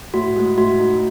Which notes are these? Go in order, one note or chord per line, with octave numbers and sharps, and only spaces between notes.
A2 F#4
G#3
A2 F#4
D#4